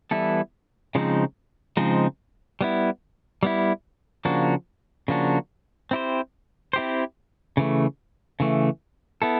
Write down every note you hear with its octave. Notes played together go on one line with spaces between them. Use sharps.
E3 G3 B3 E4 A4
C#3 F3 G#3 C4 D#4
C#3 F3 G#3 C4 D#4
G3 B3 E4
G3 B3 E4
C#3 F3 A#3 D4 F#4
C#3 F3 A#3 D4 F#4
C4 E4 G4 C5
C4 E4 G4 C5
C#3 E3 A3
C#3 E3 A3
B3 E4 A4